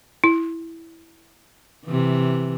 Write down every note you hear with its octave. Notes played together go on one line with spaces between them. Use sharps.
E4
C3 E3